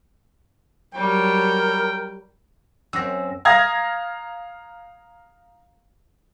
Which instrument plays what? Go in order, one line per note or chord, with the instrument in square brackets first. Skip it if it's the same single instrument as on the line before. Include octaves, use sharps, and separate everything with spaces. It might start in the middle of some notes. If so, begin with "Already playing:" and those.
[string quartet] F#3 G3 C#5 [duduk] A#4 [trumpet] G5
[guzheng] F#2 C4 [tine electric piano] E6 A#6
[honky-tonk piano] F5 A#5 D#6 G#6 A#6